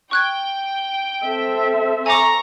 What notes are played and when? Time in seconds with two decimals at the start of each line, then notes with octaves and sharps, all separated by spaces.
0.11 G5 C#6 F#6 G#6
1.23 C4 A4 E5
2.06 G#5 A#5 C#6 D6